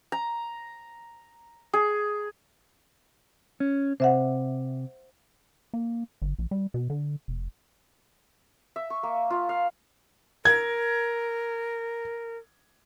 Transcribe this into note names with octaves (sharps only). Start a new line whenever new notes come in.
A#5
G#4
C#4
C3 C5 E5 F#5
A#3
G1
A#1
G3
B2
D3
F1
E5
C#6
A#3
F4
F5
A#4 G#6